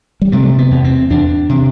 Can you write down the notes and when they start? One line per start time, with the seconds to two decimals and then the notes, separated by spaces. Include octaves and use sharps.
0.22 G3
0.32 C3 A3
0.58 B3
0.71 E2
0.84 C4
1.10 E2 D4
1.49 C3